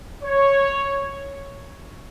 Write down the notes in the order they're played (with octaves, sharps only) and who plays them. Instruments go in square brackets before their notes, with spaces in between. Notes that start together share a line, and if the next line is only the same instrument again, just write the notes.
[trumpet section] C#5